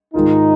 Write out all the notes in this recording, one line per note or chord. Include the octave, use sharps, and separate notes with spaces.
G#2 D#3 G#3 D#4 F4 A#4